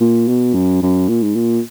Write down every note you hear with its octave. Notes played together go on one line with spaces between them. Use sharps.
A#2
B2
F#2
F#2
A#2
G#2
A#2